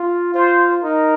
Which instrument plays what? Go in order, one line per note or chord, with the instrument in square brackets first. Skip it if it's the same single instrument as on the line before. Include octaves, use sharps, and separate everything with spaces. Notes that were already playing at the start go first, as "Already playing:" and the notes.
Already playing: [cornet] F4
[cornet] F4 [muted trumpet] C5
[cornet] D#4 [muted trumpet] A#4